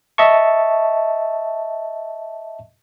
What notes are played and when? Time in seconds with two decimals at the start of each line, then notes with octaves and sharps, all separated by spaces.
0.18 D#5 E5 A5 C#6